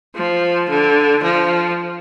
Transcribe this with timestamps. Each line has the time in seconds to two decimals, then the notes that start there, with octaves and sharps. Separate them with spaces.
0.16 F3
0.69 D3
1.23 F3